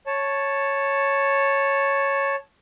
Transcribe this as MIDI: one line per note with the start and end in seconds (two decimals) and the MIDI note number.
0.06 2.36 73
0.06 2.36 81